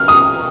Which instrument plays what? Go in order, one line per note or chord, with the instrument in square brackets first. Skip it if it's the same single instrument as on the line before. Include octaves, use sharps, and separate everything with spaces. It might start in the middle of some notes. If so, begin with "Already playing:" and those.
Already playing: [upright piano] F6
D#6